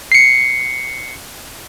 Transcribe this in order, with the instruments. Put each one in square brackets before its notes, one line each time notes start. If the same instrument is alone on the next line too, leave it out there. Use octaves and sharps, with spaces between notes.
[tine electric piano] C7 C#7